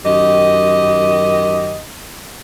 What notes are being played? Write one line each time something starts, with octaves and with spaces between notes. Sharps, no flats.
F#2 D#3 G4 D#5